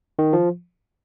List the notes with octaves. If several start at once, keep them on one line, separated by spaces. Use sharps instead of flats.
D#3
F3